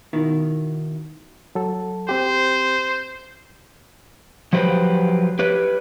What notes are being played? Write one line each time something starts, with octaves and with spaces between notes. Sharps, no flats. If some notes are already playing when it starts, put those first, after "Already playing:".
B2 D#3 E4
F#3 A4
C4 G4 C5
F3 F#3 G4 B4 C5
G4 B4 C#5